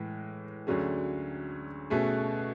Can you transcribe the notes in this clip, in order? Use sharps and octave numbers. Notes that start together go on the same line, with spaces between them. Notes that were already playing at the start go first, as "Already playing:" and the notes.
Already playing: A2 E3 G#3
D2 D3 F#3 C#4 G#4
B2 A3 C#4 G#4